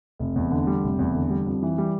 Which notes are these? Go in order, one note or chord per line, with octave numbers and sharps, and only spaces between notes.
F1
E2
D3
G3
F1
E2
D3
G3
F2
E3
G3